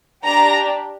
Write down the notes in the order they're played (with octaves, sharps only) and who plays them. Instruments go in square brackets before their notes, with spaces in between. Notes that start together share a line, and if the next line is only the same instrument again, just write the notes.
[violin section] D4 G4 A#5